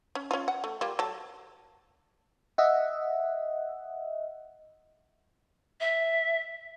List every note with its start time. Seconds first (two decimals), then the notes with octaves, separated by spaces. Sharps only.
0.15 C#4
0.31 C#4 F4
0.48 F#5
0.64 A3
0.81 G3 A#3 F4
0.99 F#3 A4
2.58 D#5 E5 F#5
5.80 E5